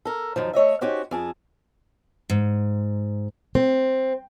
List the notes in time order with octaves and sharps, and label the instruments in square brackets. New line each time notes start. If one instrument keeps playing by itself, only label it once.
[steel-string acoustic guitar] A4 A#4
F#2 D#3 F3
A3 C#5 D#5 E5
C#4 D#4 F#4 G4 C5
F2 G#4 A5
G#2
C4